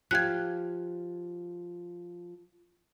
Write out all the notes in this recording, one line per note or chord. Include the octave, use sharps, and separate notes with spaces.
F3 G4 F5 F#6 G#6